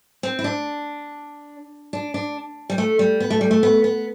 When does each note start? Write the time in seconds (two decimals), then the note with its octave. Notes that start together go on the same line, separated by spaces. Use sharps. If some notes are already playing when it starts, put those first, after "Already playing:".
0.23 C4
0.39 E4
0.44 D4
1.93 D4
2.14 D4
2.70 G3
2.78 A3
2.99 G3
3.20 B3
3.30 A3
3.41 G3
3.51 A3
3.63 B3
3.84 B3